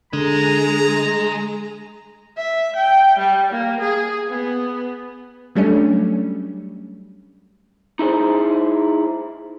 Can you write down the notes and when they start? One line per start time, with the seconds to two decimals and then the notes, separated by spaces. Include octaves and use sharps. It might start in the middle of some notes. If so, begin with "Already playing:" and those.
0.13 D3 G#3 G#4 A#5
2.37 E5
2.76 G5
3.18 G3
3.51 A#3
3.80 G#4
4.28 B3
5.55 F#3 G3 A3 C#4 D4
7.99 D#4 E4 G#4 C5